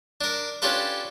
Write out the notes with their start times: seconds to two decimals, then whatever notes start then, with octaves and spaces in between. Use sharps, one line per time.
0.21 D4 A#4
0.62 C#4 D4 F4 G4 A4 B4